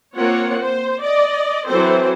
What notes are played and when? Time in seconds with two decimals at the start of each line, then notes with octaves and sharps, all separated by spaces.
0.16 A#3 C4 F4 C#5 F#5
0.61 C5
1.02 D5 D#5
1.67 E3 F#3 C4 A4 C5